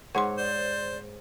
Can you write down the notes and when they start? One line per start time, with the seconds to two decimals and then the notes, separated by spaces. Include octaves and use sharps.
0.15 G#2 C#5 F#5 C6
0.38 C5 D5